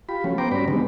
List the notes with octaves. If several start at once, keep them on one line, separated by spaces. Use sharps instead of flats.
F4 G4 B5
F3 F#3 A3 C#4
B3 C5 G5 A#5 D6
G2 F#3 C#4 D5 B5
D3 D#3 G3 G#3 B3 C4